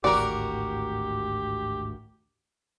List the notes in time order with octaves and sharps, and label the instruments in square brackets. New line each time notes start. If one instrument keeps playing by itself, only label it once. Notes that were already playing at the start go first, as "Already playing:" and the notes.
[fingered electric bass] G#1 D2 A2 [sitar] F#4 A#4 [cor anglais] G4 [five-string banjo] D5